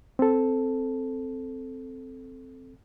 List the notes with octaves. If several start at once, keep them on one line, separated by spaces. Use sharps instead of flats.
C4 A4